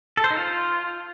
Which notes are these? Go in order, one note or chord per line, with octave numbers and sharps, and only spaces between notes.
A4
C5
D#4
F4